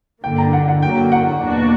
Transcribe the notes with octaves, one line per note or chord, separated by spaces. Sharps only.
G2 D3 A#3 G5
A#5
F#5
F#5
F#2 D3 F#3 A#3 G5
F#5
E2 B2 A#3 D4 F#4